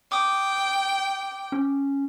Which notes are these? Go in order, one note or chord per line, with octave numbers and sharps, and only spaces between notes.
G5 D6 D#6
C#4